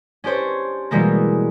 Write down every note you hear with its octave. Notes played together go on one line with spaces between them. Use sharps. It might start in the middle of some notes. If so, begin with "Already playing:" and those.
C#4 D4 G4 C5 C#5
B2 E3 G3 G#3 A#3